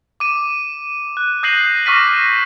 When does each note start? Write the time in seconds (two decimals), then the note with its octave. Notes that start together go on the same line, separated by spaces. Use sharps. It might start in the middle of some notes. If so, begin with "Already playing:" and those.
0.20 D6 D#7
1.17 F#6
1.43 D#6 G6 A#6 C7 D#7 F#7
1.86 C#6 D6 F6 A#6 B6 D#7